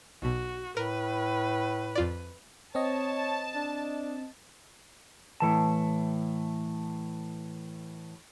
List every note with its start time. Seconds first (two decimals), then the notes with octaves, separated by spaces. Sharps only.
0.22 B1 B2 F#4
0.77 A2 A#4 B4
1.95 F2 F4 D5
2.75 C4 C#5 D#5 A5
3.55 D4
5.40 A2 E3 A5